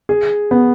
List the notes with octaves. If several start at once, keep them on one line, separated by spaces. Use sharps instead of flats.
G#4
B3